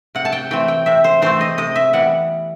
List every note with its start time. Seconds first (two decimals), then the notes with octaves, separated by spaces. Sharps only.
0.15 C3 F#5
0.25 A5
0.32 G5
0.51 E3 A3 C4 G5
0.68 G5
0.86 C3 E5
1.04 C5
1.22 E3 A3 C4 C5
1.41 D#5
1.58 C3 D#5
1.76 E5
1.93 E3 G3 B3 F#5